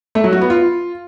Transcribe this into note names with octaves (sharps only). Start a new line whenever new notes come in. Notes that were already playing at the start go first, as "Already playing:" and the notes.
A3
F#3
F#4
B3
F4